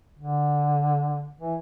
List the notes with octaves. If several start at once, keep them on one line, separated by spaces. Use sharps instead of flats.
D3
E3